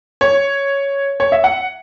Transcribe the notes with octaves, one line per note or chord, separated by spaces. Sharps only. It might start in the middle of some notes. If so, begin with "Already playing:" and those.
C#5
C#5
E5
F#5